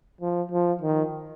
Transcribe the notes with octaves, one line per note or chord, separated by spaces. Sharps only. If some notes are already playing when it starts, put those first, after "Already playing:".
F3
F3
D#3